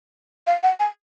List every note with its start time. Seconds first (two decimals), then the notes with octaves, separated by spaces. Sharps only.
0.47 F5
0.63 F#5
0.80 G#5